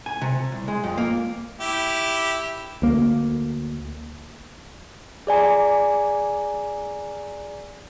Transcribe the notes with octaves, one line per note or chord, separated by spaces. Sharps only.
G#5
C3
C2
G#3
F2
A#3
E4 G4
D2 A#3
G#4 D5 G#5 A#5